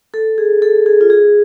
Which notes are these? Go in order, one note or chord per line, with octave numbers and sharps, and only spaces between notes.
A4
G#4
A4
G#4
F4
G#4